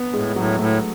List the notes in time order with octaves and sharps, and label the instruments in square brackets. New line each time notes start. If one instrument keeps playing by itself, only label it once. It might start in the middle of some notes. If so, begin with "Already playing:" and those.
Already playing: [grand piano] B3
[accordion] A2 [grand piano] G#3
[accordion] A2 [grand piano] F#3
[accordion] A2 [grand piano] A3